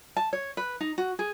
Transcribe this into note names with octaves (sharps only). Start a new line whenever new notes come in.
A5
C#5
B4
D#4
F#4
G#4